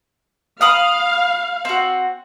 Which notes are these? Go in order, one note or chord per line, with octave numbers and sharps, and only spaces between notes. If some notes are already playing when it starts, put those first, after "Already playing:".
F5 B5 D#6 F6
C4 F#4